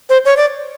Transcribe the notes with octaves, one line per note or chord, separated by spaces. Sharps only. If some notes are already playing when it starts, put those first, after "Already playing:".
C5
C#5
D5